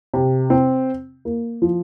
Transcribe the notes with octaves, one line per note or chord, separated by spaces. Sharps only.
C3
C4
A#3
F3